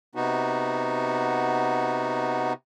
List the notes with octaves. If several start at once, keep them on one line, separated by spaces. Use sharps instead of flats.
C3 B3 D#4 F#4